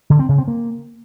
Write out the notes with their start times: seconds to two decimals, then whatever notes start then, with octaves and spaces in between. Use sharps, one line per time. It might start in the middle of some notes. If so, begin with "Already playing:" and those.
0.10 D3
0.19 C4
0.29 C#3
0.38 C4
0.48 A#3